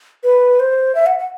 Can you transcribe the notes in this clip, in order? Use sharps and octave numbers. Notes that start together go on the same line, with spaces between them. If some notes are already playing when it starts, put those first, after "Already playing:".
B4
C5
E5
F#5
F#5